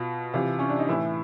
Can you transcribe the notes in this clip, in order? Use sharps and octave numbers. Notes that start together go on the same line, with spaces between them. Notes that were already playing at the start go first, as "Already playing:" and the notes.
Already playing: B2 F4
C3 E3 F4
C#4
D4
D#4
A2 E3 E4